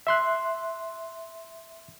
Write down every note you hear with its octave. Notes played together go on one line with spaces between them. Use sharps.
E5 C6 F#6